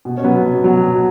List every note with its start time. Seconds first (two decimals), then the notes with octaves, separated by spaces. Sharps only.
0.05 B2
0.17 C#4
0.24 F#3 B3
0.44 B2
0.64 F#3
0.83 B2